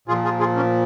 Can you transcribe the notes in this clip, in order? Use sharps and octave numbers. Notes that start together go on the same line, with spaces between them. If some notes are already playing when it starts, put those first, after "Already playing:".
A#2 F3 F4 G#4
F4 G#4
F4 G#4
A#3 C#4